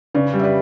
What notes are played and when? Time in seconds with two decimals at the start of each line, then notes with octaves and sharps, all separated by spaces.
0.14 C#3 B4 D5
0.34 G3
0.39 E5
0.44 B4 D5